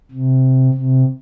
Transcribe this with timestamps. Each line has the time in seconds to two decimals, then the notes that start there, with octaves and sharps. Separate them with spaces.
0.11 C3
0.74 C3